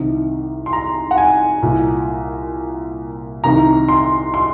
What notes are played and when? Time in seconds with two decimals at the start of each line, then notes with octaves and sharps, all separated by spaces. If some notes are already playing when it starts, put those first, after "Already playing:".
Already playing: C2 C3 D#3
0.66 C6
0.73 A#5
1.11 F#5
1.18 G#5
1.62 C2 A#2
3.44 C2 C3 D#3 A#5
3.88 C6
4.34 C6